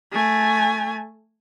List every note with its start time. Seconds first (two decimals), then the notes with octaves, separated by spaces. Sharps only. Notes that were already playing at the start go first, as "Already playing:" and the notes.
0.12 A3 G#5